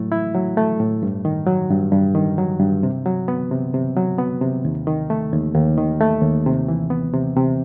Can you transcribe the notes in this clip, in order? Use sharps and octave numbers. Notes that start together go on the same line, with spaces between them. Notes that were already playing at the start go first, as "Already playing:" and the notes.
Already playing: A2 F#3 A3 E4
E4
F#3
A3
A2
G2
D#3
F#3
G2
G2
D#3
F#3
G2
C3
F#3
B3
C3
C3
F#3
B3
C3
D#2
D#3
A3
D#2
D#2
D#3
A3
D#2
C3
E3
B3
C3
C3